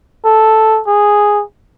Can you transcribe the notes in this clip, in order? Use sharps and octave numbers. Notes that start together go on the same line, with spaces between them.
A4
G#4